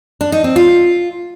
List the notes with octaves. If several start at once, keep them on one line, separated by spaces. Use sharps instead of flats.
D4
D#4
C4
F4